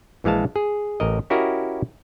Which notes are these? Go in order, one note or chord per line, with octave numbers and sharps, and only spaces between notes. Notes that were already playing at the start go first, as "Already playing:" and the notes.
A#1 E3 G#3 F5 A5
G#4
A1 A#4 D#5
C#4 E4 F#4 G4 A#4 D#5